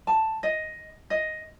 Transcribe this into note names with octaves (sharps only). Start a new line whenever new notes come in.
A5
D#5
D#5